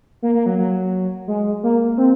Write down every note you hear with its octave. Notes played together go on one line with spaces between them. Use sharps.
A#3
A#3
F#3
F#3
G#3
A#3
C4